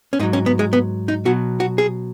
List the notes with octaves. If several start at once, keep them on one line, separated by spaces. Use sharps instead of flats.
C#4
G#2 F#3 D#4
C#4
B3
G#3
B3
D#4
B2 F#3 F#4
F#4
G#4